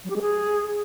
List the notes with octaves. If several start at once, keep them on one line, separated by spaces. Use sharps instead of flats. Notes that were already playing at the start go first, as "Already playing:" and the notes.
F#3
G4
G#3
G#4